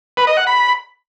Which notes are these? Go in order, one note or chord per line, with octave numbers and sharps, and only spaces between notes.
B4
D#5
F#5
B5